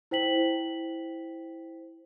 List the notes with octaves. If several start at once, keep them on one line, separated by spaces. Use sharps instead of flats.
E4 C5 G5 B6 F#7